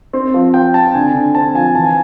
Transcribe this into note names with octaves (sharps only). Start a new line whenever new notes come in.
C4
F3
F3 G5
C4 A5
D3 G#5
D3
C4 A5
F3 G#5
E3 A5
G#5